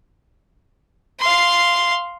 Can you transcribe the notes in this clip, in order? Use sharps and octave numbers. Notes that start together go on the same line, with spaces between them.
F5 C6